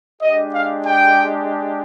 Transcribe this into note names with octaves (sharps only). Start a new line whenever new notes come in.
G#3 D4 G4 D#5
F5
G5